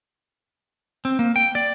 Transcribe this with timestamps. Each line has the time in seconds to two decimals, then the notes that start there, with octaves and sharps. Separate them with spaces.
1.05 C4
1.19 A#3
1.36 G5
1.55 D5